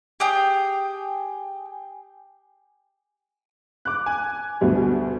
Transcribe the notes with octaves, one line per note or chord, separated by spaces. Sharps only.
G4 G#4 G5
D6 F#6
G#5
D2 B2 G3